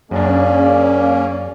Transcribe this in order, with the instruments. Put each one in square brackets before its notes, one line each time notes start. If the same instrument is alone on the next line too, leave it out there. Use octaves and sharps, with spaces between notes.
[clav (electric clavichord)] F#2 D4 [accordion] A#3 C#4 [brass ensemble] G#4 D5